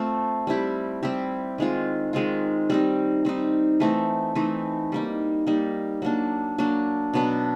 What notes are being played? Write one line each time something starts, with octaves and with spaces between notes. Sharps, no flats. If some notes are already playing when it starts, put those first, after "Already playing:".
Already playing: A3 C4 F4
G3 C4 E4 G4
G3 C4 E4 G4
D#3 G#3 C4 F4
D#3 G#3 C4 F4
G3 C4 D#4
G3 C4 D#4
E3 A3 C4 D#4
E3 A3 C4 D#4
G3 A#3 D#4
G3 A#3 D#4
F#3 A#3 D4
F#3 A#3 D4
B2 F#3 B3 D4